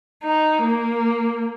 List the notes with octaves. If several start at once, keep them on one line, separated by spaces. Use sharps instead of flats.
D#4
A#3